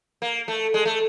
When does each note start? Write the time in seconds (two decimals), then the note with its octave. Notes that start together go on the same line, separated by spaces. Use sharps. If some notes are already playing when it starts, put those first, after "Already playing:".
0.22 A#3
0.48 A3
0.74 G#3
0.86 A3